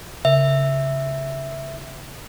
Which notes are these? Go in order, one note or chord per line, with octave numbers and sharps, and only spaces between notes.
C#3 E5